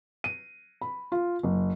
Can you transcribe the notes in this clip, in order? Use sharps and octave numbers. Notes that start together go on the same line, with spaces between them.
D#7
B5
F4
F#1